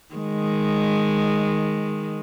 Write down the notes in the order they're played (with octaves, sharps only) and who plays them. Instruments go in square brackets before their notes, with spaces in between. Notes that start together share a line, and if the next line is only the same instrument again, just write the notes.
[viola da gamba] D#3 G#3